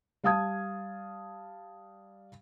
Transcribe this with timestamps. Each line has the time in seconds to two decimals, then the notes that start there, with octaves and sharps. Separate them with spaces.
0.24 G3 F5 A5 D#6 G#6